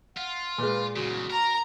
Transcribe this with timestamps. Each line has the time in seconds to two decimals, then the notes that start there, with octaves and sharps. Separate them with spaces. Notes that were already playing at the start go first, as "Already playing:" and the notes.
0.17 F4 F#5
0.58 A#2 G#3 B4
0.96 E2 C#3 F#4
1.30 A#4 A#5